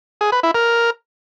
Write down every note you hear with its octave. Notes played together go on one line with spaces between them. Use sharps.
G#4
B4
E4
A#4